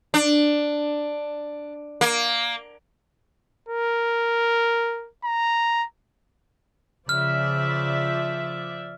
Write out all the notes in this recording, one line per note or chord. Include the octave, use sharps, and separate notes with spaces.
D4
A#3
A#4
A#5
C#3 F3 D5 E5 F6